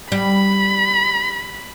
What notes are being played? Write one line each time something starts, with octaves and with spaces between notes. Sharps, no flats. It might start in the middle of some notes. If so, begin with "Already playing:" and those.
G3 B5